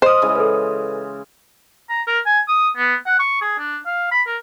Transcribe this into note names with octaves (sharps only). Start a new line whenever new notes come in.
C5 D#5 D#6 F6
C#3 E3 G#3
A4 B4
A#5
A#4
G#5
D#6
B3
F#5
C#6
G#4
D4
F5
B5
A#4